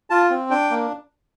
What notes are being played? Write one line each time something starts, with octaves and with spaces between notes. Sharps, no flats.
F4 A5
C4
D4 G5
A#3